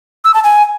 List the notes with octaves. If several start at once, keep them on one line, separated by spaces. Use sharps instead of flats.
E6
A5
G#5